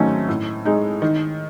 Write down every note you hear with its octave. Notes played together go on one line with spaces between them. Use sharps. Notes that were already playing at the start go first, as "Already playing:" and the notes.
Already playing: G#2 D#3 F#3 A3 C#4
A2
G#3 D#4
D#3